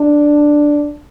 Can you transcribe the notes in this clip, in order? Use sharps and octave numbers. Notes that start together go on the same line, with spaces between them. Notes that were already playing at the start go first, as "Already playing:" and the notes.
Already playing: D4